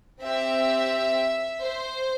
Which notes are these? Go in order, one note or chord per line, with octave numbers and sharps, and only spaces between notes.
C4 G4 E5
C5